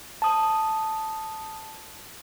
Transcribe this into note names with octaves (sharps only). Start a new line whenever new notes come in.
A5 D#6